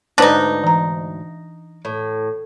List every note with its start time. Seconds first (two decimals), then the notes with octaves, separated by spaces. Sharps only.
0.18 D2 G#2 D4 D#4 B4 C5
0.64 E3 A#5
1.85 A2